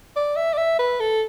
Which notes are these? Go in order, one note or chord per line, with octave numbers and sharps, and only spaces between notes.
D5
E5
D5
E5
B4
A4